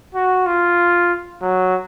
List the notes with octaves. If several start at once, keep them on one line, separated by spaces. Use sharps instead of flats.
F#4
F4
F#3